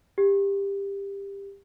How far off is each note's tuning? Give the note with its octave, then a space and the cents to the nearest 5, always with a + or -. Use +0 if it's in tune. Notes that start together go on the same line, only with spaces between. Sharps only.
G4 +20